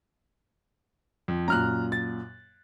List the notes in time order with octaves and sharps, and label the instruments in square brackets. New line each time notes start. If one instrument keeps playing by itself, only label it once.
[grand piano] F2
[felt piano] F#2 A#2 [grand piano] A#5 F6 F#6
[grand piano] A6